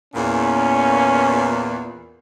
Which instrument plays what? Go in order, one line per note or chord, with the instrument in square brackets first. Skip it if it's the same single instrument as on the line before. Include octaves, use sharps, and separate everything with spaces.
[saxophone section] E2 A#2 [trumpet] C#4